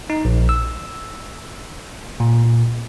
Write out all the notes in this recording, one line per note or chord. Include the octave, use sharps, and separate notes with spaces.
D#4
A#1
E6
A#2